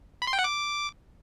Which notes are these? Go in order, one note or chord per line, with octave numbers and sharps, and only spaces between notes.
B5
C6
G5
F#5
D6